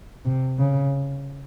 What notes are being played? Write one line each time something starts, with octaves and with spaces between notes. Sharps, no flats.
C3
C#3